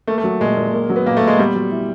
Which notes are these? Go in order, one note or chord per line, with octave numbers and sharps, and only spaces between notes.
A3 A#3
A3
F#3
A#2 G#3
A#2
A#3
F#3
B3
A#2 A#3
A3
A#2 G#3
G3 B3
F#3
E4